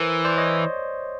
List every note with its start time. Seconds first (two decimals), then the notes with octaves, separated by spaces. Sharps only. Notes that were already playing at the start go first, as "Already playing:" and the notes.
Already playing: E3 A#4 C5
0.25 C5 D5
0.37 C#5 D#5